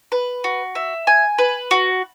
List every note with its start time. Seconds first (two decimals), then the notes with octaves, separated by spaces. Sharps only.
0.12 B4
0.44 F#4
0.75 E5
1.07 G#5
1.38 B4
1.71 F#4